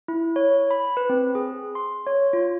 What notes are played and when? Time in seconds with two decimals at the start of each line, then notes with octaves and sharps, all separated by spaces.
0.08 E4
0.36 C#5
0.71 B5
0.97 B4
1.10 C4
1.35 G#4
1.75 C6
2.07 C#5
2.33 F4